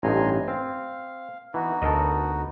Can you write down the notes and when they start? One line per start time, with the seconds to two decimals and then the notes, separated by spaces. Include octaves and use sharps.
0.03 A1 G2 D#4 G#5 A#5 C6
0.48 C4 F5
1.54 E3 B3 D#4 F#4
1.82 D2 A4 A#4 D#5